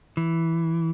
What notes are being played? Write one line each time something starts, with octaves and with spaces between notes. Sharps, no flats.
E3